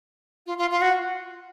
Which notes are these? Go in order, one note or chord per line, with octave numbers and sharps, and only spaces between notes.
F4
F4
F4
F#4